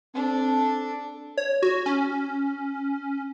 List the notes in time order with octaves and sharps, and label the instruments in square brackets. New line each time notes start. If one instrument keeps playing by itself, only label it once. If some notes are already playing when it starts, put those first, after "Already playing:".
[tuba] C4 [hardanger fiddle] D4 A4
[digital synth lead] C#5
F#4
C#4